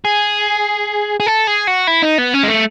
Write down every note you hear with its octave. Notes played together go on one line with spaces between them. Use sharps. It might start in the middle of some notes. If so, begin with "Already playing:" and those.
G#4
G#4
A4
G#4
F#4
E4
D#4
B3
C#4
G#3
A3